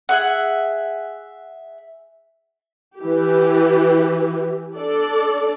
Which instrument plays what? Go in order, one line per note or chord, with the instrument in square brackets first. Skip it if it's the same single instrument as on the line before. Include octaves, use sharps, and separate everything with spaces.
[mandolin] G#4 E5 F#5
[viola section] E3 G4
D4 A4 D5